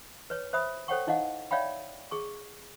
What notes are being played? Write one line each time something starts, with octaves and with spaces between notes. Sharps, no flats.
B4 C#5
C5 E5 B5 D#6
A4 C5 C#5 F#5 G5 C#6
D#4 E4 D#5 F5 F#5
C#5 D5 E5 F5 G5 B5
G#4 C#6